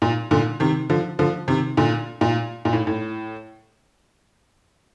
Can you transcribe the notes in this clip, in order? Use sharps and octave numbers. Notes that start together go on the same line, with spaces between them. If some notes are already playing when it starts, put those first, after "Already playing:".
A#2
A#2 D3
C3 D#3
D3 F3
D3 F3
C3 D#3
A#2 D3
A#2
A#2
A2
A2